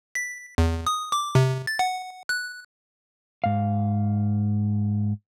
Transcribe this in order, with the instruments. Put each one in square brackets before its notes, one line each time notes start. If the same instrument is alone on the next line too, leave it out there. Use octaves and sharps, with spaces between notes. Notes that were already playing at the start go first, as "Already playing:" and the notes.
[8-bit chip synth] B6
E2
D#6
D6
C3
A6
F#5
F#6
[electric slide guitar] G#2 F5